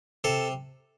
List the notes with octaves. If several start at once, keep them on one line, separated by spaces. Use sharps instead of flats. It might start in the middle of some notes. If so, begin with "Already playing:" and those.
C3 A4